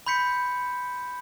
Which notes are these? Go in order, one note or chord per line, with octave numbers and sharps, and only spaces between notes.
B5 C6 G6 B6 C#7